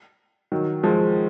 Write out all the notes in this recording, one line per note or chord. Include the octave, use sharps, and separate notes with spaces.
D#3 F#3
F3 G#3